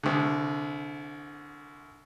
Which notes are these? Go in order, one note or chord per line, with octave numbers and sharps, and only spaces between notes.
C2 D3